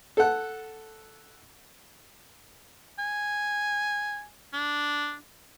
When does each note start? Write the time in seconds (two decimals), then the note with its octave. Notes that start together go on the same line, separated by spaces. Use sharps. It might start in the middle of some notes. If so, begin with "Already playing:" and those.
0.17 A4 F#5
2.99 G#5
4.53 D4